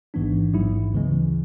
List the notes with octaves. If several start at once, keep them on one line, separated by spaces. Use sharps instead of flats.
A1 G#2 E3 B3 D4
A1 G#2 F#3 B3 E4
D2 C#3 E3 G#3